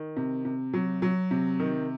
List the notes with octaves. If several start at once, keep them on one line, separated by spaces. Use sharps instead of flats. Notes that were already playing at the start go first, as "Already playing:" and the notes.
Already playing: D#3
C3
C3
F#3
F#3
C3
D#3